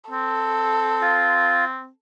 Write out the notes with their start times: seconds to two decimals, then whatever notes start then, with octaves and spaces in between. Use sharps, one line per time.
0.10 C4 A4
1.01 F4